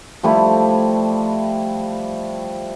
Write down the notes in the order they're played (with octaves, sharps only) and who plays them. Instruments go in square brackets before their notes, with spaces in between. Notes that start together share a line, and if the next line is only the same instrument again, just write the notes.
[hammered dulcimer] F3 G3 A3 E4